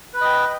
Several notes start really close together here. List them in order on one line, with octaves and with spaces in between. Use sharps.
B4 B5 D#5 G5